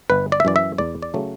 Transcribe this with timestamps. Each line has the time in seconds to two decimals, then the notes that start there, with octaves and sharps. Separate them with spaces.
0.10 G1 B4
0.32 D5
0.40 E5
0.45 F#2 E3 D5
0.56 E5
0.78 E2 D5
1.02 D5
1.14 C#3 F#3 A3